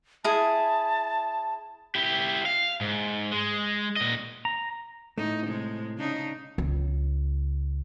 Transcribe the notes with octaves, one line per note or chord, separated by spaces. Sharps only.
E4 G#4 A5
E4 G4
F5
G#2
G#3
A#2 D#5
A#5
A2 A3 D#4
C3 G#3
C#3 D4 D#4
C#2